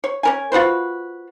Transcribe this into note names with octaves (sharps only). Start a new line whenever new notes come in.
C#5
C#4 A#4 G#5
F4 F#4 B4 C5